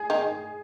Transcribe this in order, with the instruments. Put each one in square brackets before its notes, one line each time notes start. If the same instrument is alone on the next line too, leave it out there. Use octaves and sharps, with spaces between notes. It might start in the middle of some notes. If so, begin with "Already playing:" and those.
Already playing: [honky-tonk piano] G#4
[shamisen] D#3 D#4